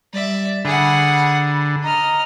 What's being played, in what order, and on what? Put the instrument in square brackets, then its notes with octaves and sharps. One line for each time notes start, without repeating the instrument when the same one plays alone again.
[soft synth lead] G3 [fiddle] D5 E5
[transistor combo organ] D3 [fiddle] G#4 F#5 [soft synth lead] B5
[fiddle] D#5 F6 [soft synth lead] A#5